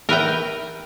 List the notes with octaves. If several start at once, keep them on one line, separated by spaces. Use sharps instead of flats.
A#4 B4 E5 G5